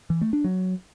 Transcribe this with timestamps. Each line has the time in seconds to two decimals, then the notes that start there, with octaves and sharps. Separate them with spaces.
0.10 E3
0.21 A3
0.33 D4
0.44 F#3